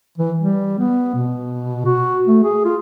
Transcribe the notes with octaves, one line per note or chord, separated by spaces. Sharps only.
E3
G3
B3
B2
F#4
A3
G#4
F4